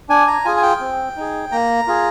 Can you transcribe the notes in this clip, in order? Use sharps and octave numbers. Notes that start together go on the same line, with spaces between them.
D4 G#5
A#5
F4 G#4 G#5
G#5
G5
C4
D#4 G#4
A#3 A#5
F4 G#4